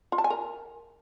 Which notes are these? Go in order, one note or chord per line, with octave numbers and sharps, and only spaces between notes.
F4
A5
G#5
A#4